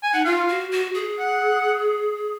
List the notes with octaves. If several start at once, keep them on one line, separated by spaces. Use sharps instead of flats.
G#5
D#4 F#5
F4 F5
F#4
F#4
G#4
F#5